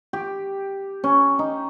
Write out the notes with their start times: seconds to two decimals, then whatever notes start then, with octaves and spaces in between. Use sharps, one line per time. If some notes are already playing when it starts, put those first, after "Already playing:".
0.13 G4
1.04 C#4
1.39 D#4